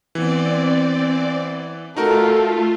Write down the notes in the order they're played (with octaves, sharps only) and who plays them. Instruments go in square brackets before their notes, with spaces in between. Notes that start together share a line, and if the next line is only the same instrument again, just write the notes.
[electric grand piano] E3 B3 [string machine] C4 D5
[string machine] A3 F4 [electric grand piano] D#4 F#4 A#4 [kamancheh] A4